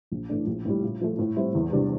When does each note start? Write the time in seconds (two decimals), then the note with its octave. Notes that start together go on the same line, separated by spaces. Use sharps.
0.12 A#1
0.29 A2 E3 A3 D4
0.47 A#1
0.65 A2 G3
0.83 A#2
1.01 F3 A3
1.18 A2
1.36 G3 C4 E4
1.55 E2
1.72 C3 E3 G3 D4